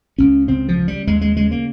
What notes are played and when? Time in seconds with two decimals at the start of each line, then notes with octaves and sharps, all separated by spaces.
0.18 C#2 C#4
0.48 C#3 C4
0.68 F3
0.78 C#3
0.88 G3
1.07 D#2 G#3
1.21 G#3
1.36 C#3 G#3
1.51 A#3